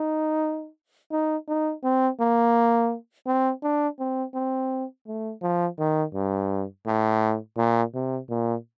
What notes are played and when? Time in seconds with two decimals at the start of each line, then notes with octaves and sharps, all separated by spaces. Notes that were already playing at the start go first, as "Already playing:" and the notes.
Already playing: D#4
1.11 D#4
1.48 D#4
1.83 C4
2.20 A#3
3.27 C4
3.63 D4
3.99 C4
4.34 C4
5.07 A3
5.42 F3
5.79 D#3
6.14 G2
6.86 A2
7.57 A#2
7.94 C3
8.29 A#2